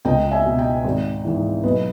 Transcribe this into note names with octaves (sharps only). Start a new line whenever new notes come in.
C#2 D#5 G5
E5 G#5
B2
D#5 G5
G#1
G#2 E3
B1 B4 D#5